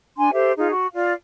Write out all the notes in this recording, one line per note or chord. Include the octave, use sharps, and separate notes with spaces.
D4 G#5 C6
G4 A4 C5 E5
D#4 F4 G#4
F#4
F4 D5 F5